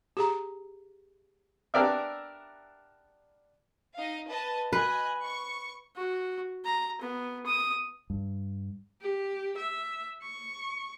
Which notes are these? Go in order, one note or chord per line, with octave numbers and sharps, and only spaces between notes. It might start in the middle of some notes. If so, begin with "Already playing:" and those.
G4 G#4 A#5
B3 D4 G4 A#4 D5 E5
D#4 D#5 F5
B4 D#5 A5
B4 D#5 G#5 F#6
C#6
F#4
A#5
B3
D#6
G2
G4
E5
C#6